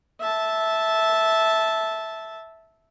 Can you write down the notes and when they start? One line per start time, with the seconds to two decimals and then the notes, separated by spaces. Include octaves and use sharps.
0.20 E5 A5